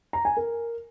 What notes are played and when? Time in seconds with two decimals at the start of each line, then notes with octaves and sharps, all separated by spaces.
0.13 A#5
0.25 G#5
0.37 A#4